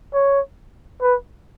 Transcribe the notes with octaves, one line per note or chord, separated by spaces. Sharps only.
C#5
B4